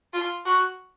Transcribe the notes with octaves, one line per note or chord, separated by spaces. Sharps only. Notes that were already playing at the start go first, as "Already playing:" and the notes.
F4
F#4